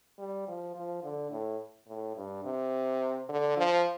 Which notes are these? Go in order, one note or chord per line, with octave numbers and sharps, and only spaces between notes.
G3
F3
F3
D3
A2
A2
G2
C3
D3
F3